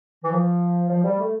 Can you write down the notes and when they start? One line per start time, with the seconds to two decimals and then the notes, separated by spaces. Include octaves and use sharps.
0.23 E3
0.31 F3
0.90 F3
1.04 G3
1.19 A3